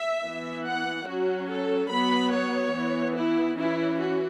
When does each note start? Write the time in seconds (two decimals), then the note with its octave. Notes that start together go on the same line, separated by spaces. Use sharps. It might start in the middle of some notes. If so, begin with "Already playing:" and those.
Already playing: E5
0.25 E3 B3
0.67 F#5
1.08 F#3 C#4 F#4
1.50 A4
1.91 F#3 B3 B5
2.33 C#5
2.74 E3 B3
3.16 E4
3.57 E3 C#4 E4
3.99 F#4